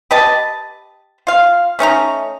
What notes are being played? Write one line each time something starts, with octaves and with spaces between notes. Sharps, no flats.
G4 B4 D#5 A5
F4 F5
A3 C#4 D#4 A#5